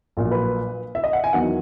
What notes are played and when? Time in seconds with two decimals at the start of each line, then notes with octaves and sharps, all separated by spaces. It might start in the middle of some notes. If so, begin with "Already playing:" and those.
0.17 A#1 A#2 F#3
0.31 B4
0.95 E5
1.04 D#5
1.13 F#5
1.24 G#5
1.33 E2 D#3 F#3 F#5